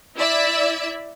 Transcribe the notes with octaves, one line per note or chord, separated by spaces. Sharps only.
E4 D5 E5